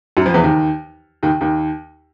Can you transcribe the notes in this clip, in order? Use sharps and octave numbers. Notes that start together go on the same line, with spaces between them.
F#2 F#3
F2 F3
E2 E3
D#2 D#3
D#2 D#3
D#2 D#3